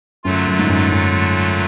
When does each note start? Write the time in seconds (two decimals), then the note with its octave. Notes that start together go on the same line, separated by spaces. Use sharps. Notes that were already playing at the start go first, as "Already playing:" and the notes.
0.24 F#2 D3 F#3 A3 F4
0.47 F#2
0.59 G#2
0.69 F#2
0.92 F#2